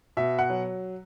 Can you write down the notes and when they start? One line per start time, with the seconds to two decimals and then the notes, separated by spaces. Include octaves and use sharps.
0.17 B2 E5
0.39 F#5
0.50 F#3